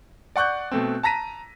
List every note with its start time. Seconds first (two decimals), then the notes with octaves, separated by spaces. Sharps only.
0.36 D5 F#5 C#6 F#6 G6
0.71 B2 A3 C4
1.03 A5 A#5 A#6 B6 D#7